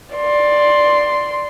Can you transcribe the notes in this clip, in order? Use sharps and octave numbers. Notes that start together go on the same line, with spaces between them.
D5 C6